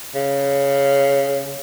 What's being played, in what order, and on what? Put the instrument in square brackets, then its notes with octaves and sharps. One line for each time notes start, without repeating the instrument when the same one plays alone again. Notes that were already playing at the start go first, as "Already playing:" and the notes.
[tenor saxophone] C#3